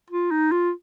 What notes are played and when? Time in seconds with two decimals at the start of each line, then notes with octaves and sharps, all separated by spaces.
0.11 F4
0.31 D#4
0.52 F4